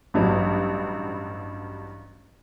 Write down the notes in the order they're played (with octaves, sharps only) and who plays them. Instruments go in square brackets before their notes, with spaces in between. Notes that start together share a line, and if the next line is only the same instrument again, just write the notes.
[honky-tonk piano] A1 G2 F#3 G3